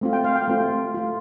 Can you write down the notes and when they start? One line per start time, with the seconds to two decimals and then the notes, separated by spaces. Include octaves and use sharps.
0.01 A3 C4 F4
0.13 G5
0.24 F5
0.36 G5
0.48 A3 C4 F4
0.94 A3 F4